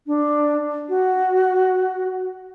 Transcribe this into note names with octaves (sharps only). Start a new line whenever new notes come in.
D4
F#4